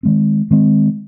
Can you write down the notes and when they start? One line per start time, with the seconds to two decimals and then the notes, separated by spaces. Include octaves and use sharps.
0.03 D#3 G#3 C4
0.51 D#3 G#3 C4